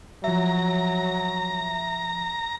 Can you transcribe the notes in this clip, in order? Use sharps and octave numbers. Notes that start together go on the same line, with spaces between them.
F3 F#3 E5 A#5